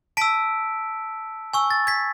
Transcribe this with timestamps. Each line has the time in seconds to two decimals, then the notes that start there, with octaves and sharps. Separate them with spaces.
0.17 A5 E6 B6 D7
1.53 G#5 C#6 E6
1.71 A6
1.87 G#6 B6